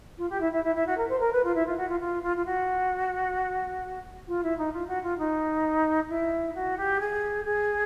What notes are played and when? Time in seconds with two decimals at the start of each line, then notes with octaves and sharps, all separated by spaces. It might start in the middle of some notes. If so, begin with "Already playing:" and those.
0.17 F4
0.29 G4
0.40 E4
0.52 E4
0.63 E4
0.75 E4
0.86 F#4
0.97 A#4
1.09 C5
1.20 A#4
1.32 B4
1.43 F4
1.54 E4
1.65 F4
1.77 F#4
1.88 F4
1.99 F4
2.22 F4
2.36 F4
2.45 F#4
4.27 F4
4.43 E4
4.58 D#4
4.72 F4
4.87 F#4
5.03 F4
5.18 D#4
6.08 E4
6.54 F#4
6.77 G4
6.99 G#4
7.45 G#4